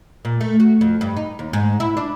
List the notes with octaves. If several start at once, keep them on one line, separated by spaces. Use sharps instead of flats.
A#2
A3
F#4
F2
G2
D#4
D#2
G#2
E4
D4